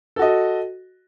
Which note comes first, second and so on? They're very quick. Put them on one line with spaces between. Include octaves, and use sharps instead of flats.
A4 F#4 D#5